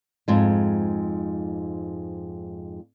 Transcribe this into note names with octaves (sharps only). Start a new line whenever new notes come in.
F2 G#2 G#3